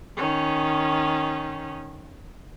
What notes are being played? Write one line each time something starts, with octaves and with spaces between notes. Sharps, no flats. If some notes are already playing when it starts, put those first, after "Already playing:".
D#3 C#4